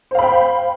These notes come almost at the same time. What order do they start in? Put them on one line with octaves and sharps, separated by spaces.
C5 F5 B5 G5